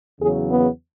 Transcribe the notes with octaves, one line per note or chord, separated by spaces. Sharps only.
E2 C#3 F#3 G#4
B3